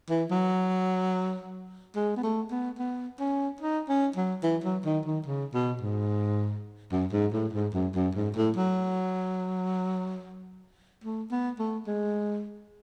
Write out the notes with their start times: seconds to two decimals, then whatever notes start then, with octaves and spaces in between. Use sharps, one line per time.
0.10 E3
0.31 F#3
1.96 G#3
2.17 B3
2.23 A3
2.51 B3
2.79 B3
3.20 C#4
3.61 D#4
3.89 C#4
4.16 F#3
4.43 E3
4.64 F#3
4.85 D#3
5.06 D#3
5.27 C#3
5.54 B2
5.82 G#2
6.92 F#2
7.13 G#2
7.33 A2
7.53 G#2
7.74 F#2
7.95 F#2
8.15 G#2
8.36 A2
8.57 F#3
11.04 A3
11.32 B3
11.59 A3
11.87 G#3